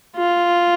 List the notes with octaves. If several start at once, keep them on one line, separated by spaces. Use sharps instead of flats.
F4